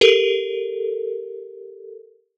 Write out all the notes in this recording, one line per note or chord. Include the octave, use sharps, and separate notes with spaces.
G4 A4 A#4